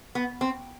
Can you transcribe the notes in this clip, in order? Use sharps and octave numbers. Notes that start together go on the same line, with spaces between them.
B3
C4